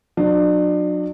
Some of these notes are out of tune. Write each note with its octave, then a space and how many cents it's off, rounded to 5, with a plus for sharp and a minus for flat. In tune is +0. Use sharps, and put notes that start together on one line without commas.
F#3 -30 D4 +35